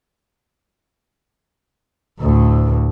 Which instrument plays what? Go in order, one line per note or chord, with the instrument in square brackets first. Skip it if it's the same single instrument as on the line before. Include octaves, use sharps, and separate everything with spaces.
[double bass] D2 A2